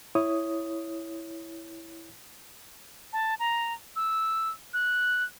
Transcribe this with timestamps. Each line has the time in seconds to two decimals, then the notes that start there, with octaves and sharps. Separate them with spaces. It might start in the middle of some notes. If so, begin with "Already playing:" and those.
0.15 E4 C#5 D#6
3.13 A5
3.40 A#5
3.96 E6
4.74 F#6